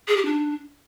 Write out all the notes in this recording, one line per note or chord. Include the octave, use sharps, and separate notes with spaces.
G#4
G4
D4